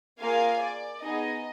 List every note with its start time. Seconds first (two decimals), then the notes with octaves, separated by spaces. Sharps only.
0.20 A#3 F4 G#4 F5 G#5
0.61 D5
1.02 B3 D#4 G#4 D#5